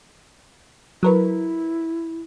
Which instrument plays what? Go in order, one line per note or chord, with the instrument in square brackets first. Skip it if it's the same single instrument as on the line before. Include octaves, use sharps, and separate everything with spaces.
[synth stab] F#3 A#4 B4 [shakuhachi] E4